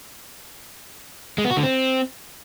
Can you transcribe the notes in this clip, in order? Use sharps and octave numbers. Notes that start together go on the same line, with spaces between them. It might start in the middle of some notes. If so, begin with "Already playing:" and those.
G#3
B3
F#4
D3
C4